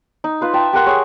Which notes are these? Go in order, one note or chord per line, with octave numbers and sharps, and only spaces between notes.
D#4
F4 B4 F5
E5 G5 A5
G4 A#4 F#5 C6
G#4 C#5